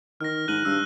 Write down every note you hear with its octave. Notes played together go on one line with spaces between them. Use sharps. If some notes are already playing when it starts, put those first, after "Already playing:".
D#3 F6 A#6
G#2 F#6 D#7 F#7
G2 E6